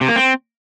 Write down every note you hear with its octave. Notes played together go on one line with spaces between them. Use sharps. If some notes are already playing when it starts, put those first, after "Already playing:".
C3
A#3
C4